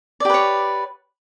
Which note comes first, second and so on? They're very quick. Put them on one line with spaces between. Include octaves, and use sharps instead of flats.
D5 G4 B4 C#5